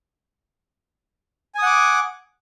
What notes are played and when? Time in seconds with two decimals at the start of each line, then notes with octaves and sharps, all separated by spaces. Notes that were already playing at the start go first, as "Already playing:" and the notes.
1.55 G#5
1.59 D#6
1.62 F#5
1.66 D6